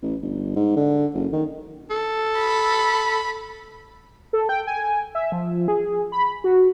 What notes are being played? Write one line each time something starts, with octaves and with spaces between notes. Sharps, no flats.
A1
G1
G#2
D3
F#1
D#3
A4
B5
A4
G5
G#5
E5
F3
G#4
B5
F#4